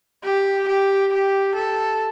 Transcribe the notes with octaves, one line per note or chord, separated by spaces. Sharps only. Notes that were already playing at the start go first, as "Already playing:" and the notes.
G4
G4
G4
A4